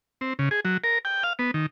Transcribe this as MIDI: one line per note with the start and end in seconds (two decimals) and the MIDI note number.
0.21 0.33 60
0.39 0.49 49
0.51 0.60 68
0.65 0.77 54
0.84 0.98 70
1.05 1.23 79
1.23 1.33 77
1.39 1.51 59
1.54 1.66 51